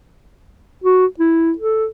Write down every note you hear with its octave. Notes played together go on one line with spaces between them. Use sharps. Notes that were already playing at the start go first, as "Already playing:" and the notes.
F#4
E4
A4